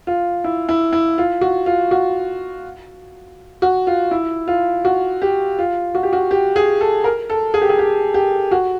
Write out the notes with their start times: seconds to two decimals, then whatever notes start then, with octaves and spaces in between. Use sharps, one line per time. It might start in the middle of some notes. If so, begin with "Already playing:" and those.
0.07 F4
0.44 E4
0.69 E4
0.93 E4
1.18 F4
1.41 F#4
1.66 F4
1.91 F#4
3.62 F#4
3.87 F4
4.11 E4
4.48 F4
4.85 F#4
5.22 G4
5.59 F4
5.95 F#4
6.03 G4
6.13 F#4
6.31 G4
6.56 G#4
6.81 A4
7.04 A#4
7.30 A4
7.54 G#4
7.62 G4
7.69 G#4
7.79 G4
8.14 G4
8.51 F#4